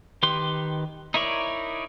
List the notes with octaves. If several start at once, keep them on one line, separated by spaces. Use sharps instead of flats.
D#3 G4 B4 C6
D#4 E4 A#4 C#5 D5